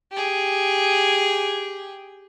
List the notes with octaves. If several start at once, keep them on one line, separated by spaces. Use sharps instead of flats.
G4 G#4